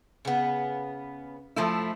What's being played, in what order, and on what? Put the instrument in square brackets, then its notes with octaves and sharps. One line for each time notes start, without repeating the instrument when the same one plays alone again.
[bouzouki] C#3 B3
[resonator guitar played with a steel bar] F3 A3 E4